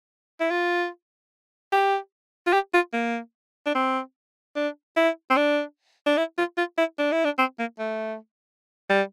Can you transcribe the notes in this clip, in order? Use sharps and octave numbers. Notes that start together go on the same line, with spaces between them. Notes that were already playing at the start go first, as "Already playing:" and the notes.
E4
F4
G4
F4
G4
F4
A#3
D4
C4
D4
E4
C4
D4
D4
E4
F4
F4
E4
D4
E4
D4
C4
A#3
A3
G3